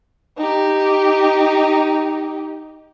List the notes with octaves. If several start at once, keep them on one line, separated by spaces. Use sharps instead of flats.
D#4 G4